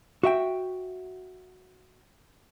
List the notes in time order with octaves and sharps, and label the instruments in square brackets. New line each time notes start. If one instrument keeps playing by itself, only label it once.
[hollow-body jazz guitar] F#4 E5 G5